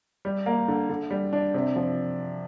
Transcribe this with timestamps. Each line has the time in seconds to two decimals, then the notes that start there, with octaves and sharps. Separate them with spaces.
0.25 G3
0.46 A#3
0.68 D3
0.89 D3
1.11 G3
1.33 D4
1.54 C3
1.76 F3